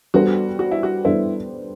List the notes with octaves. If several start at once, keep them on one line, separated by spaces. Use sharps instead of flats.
G3 B3 D4 F#4 A4 C5
F#4
E4
F#4
G3 B3 D4 E4 A4 C5